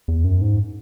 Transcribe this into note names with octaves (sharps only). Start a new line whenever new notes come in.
E2
F#2
G#2